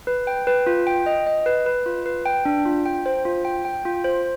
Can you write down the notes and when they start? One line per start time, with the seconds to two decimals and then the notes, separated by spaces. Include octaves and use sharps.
0.07 B4
0.27 G5
0.47 B4
0.67 F4
0.87 G5
1.06 D#5
1.27 D#5
1.46 B4
1.66 B4
1.86 F4
2.06 B4
2.26 G5
2.46 D4
2.65 F4
2.86 G5
3.06 C5
3.25 F4
3.45 G5
3.65 G5
3.85 F4
4.04 C5